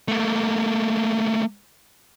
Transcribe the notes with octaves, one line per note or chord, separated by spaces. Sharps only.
A3 A#3